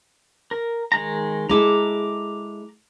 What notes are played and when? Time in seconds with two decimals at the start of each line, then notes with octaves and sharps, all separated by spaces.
0.51 A#4
0.92 D#3 G#3 A#5
1.49 G#3 E4 A4 A#5 D6